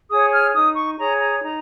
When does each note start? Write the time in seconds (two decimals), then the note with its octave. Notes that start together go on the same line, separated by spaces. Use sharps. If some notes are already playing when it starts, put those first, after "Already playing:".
0.10 G#4 C#5 D#6
0.32 F6
0.54 D#4 D#6
0.75 C#6
0.98 G#4 C#5 A#5
1.20 A#5
1.41 D#4 A#5